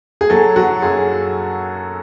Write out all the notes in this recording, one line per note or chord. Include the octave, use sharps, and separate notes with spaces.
G#4
F#3 A4
F#3 F#4
F#2 G#4